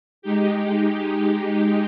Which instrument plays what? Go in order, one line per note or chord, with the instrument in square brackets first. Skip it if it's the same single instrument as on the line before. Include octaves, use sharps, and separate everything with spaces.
[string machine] G#3 D#4 G4